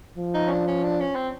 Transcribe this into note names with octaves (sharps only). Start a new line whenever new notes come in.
F3
D#4
C#4
D4
C#4
D4
C#4
C4